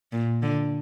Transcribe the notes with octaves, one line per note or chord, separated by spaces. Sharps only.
A#2
D3